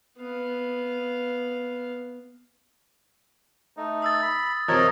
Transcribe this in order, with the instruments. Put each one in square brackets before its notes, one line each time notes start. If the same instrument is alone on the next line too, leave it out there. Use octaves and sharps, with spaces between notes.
[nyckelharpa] B3 F5
[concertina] A3 D#4
[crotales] D#6 E6 A6
[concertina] B5
[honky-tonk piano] C3 F3 [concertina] A#4 C#5 D#5